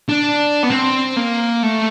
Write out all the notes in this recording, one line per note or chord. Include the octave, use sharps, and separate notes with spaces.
D4
B3
C4
A#3
A3